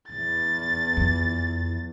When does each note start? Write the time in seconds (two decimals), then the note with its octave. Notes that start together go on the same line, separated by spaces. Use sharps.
0.11 E2 E3 A6
0.97 F2